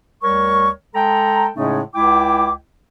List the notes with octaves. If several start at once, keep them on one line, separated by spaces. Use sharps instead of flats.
D2 G3 A#4 C#5 C#6
G#3 A4 G5 A#5
A2 C#3 G#3 A3 C#4 D#4
C#2 G#3 E4 G5 D6